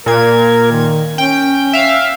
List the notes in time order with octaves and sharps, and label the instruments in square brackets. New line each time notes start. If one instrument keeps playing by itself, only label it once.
[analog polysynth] A#2 G#6 [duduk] A#4
[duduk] D#3
[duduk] C#4 [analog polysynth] G5
[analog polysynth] E5 F5